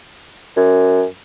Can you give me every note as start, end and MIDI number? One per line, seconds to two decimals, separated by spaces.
0.57 1.04 42